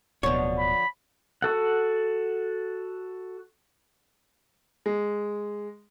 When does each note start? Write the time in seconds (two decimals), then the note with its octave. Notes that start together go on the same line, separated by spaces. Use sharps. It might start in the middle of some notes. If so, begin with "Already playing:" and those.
0.23 D1 B2 D3 F3 C#5
0.58 B5
1.42 F#4 A4 F#5
4.86 G#3